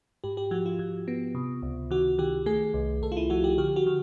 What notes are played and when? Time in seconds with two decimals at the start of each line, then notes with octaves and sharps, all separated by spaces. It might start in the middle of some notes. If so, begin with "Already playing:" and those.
0.24 G#2 G4
0.37 G4
0.51 F3 F#4
0.66 F4
0.79 F3
1.08 B3
1.35 C3
1.63 C#2
1.91 D#3 F#4
2.18 D#3 G4
2.46 A3 G#4
2.74 C2
3.02 C2 A4
3.12 F4
3.17 E4
3.30 F3 F#4
3.44 G4
3.58 D3 G4
3.76 F#4
3.86 D3